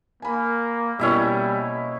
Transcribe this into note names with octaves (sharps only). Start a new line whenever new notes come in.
A#3 G#5 B5
B2 G3 A#3 C#4 E4 E5